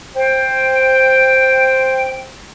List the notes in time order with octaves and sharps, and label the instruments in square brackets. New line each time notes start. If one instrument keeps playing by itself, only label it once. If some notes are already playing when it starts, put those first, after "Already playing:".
[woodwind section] C5 G5